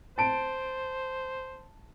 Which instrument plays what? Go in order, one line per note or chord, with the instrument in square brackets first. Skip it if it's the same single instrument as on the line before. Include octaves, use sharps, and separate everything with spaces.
[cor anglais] C5 [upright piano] A5 D7